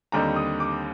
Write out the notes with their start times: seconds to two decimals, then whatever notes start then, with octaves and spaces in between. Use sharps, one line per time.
0.12 D#2 D3 G3 C4 D#4 A#5
0.36 D#6
0.60 D6